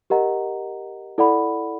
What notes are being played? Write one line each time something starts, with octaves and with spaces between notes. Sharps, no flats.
G4 A#4 D#5 F#5 A#5
E4 A4 D5 F#5 B5